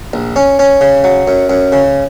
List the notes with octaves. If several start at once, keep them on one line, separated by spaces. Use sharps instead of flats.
A#1
C#4
C#4
C#3
F#3
F#2
F#2
C#3